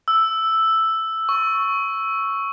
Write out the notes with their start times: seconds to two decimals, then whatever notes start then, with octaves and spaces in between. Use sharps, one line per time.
0.08 E6
1.29 C#6